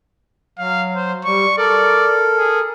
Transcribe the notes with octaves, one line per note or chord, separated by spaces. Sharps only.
F#3 F5
C5
G3 C#6
A4 A#4 D5
G#4